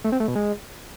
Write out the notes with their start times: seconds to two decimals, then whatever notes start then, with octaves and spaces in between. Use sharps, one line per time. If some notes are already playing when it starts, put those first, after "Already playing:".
0.04 A3
0.12 C4
0.20 A3
0.28 B2
0.36 G#3